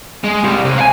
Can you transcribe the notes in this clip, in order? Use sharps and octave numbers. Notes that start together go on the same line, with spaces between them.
G#3
C2 G3
C3
F5 G#5